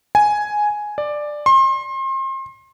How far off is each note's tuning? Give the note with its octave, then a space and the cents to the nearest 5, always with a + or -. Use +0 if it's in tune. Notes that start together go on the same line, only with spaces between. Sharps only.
G#5 +5
D5 +10
C6 +35